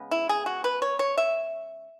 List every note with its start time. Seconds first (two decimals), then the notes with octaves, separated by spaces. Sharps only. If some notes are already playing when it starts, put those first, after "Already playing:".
Already playing: C#3 G#3 B3
0.11 E4
0.29 G#4
0.46 F#4
0.64 B4
0.82 C#5
0.99 C#5
1.18 E5